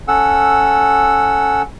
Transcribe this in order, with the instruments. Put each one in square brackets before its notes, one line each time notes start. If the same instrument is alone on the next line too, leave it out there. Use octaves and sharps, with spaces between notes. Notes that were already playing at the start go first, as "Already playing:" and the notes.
[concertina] C#4 A4 F#5 E6